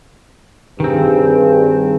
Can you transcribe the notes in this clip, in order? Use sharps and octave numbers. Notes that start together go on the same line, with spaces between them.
G2 D#3 C4 G#4